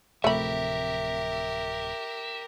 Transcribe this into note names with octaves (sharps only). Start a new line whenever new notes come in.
D1 C3 F3 A3 G4 A#4 E5 B5